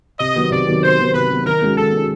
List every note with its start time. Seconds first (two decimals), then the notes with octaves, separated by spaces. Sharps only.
0.20 C3 D#5
0.36 D#3 F#3 B3
0.51 C3 D5
0.66 D#3 F#3 B3
0.83 C3 C5
0.99 D#3 F#3 B3
1.14 C3 B4
1.30 D#3 F#3 B3
1.46 D#3 A#4
1.62 G#3 C#4 F#4
1.77 D#3 A4
1.93 G#3 C#4 F#4